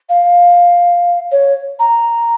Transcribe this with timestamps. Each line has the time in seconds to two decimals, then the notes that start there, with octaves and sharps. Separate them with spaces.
0.09 F5
1.32 C#5
1.80 A#5